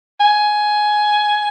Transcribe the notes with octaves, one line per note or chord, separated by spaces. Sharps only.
G#5